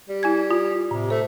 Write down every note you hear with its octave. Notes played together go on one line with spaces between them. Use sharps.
G3
E4 G#5 G#6
F4
A2 C3
A3 C5